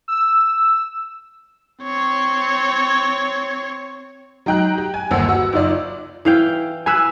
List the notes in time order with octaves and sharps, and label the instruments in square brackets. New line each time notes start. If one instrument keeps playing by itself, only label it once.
[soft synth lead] E6
[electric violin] C4 C#5
[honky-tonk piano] F#3 D#4 G5 A#5 F#6
G4
G#5
G1 D#2 C5 F#5 E6
F#4 F#5 E6
F#1 D#4 F4 D5
[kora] E3 F5 G5
[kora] B4 F5 [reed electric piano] G#5 E6 F#6